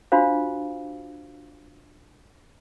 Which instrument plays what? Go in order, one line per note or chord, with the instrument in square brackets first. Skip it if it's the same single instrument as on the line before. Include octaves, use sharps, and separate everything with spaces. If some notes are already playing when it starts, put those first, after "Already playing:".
[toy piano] D4 F4 F#4 C5 F5